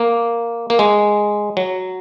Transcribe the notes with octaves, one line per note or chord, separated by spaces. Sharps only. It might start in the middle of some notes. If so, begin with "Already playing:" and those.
Already playing: A#3
A#3
G#3
F#3